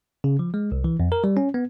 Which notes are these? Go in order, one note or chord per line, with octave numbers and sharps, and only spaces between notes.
C#3
F3
G#3
C2
E3
F2
A#4
G3
C#4
B3